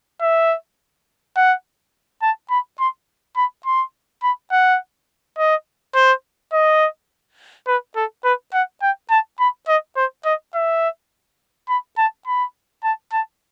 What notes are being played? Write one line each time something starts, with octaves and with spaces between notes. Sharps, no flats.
E5
F#5
A5
B5
C6
B5
C6
B5
F#5
D#5
C5
D#5
B4
A4
B4
F#5
G5
A5
B5
D#5
C5
D#5
E5
B5
A5
B5
A5
A5